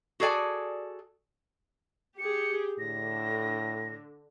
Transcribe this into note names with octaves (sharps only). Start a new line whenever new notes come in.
F#4 G#4 A4 D5 G#5
G4 G#4 C#7
A2 D3 A#6